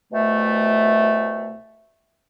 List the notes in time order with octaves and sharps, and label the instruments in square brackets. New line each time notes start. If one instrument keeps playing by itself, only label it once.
[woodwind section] C2 B2 A3